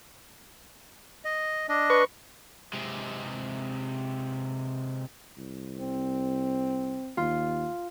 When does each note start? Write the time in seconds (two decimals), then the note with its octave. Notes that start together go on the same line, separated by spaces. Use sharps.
1.25 D#5
1.69 D4 D#5
1.90 B4 C#6
2.73 C3 G#3
5.38 C2
5.81 C4
7.17 D#2 F4